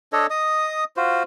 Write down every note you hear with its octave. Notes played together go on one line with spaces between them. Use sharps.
D4 A4 C#5 D#5
D#5 D#6
F4 F#4 C5